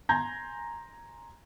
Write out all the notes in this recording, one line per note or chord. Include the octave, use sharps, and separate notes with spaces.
G#5 A#5 C6 G6 G#6 A#6